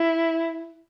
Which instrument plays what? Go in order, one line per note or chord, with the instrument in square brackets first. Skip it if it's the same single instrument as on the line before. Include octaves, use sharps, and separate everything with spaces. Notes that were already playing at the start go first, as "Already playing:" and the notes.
Already playing: [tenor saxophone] E4